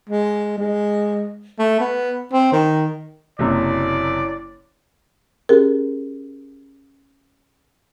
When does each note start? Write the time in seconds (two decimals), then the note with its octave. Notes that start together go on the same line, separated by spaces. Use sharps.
0.09 G#3
0.58 G#3
1.59 A3
1.80 B3
2.33 C4
2.52 D#3
3.39 F#1 F#2 C3 E4 C#5 D5
5.49 C#4 G4 G#4 A#4